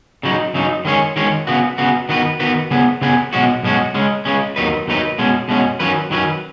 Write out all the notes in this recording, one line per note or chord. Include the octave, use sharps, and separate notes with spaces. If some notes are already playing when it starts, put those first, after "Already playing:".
C#3 F#3 D#4
C#3 F#3 D#4
D#3 G#3 C#4 G#4 C#5
D#3 G#3 C#4 G#4 C#5
C#3 B3 F#4
C#3 B3 F#4
D#3 B3 F#4 B4
D#3 B3 F#4 B4
C#3 B3 G#4 B4
C#3 B3 G#4 B4
B1 B2 G#3 C#4 F#4
B1 B2 G#3 C#4 F#4
C#3 G#3 C#4
C#3 G#3 C#4
D#2 D#3 F#3 D#4 B4
D#2 D#3 F#3 D#4 B4
B2 G#3 C#4
B2 G#3 C#4
D#3 F#3 C#4 B4
D#3 F#3 C#4 B4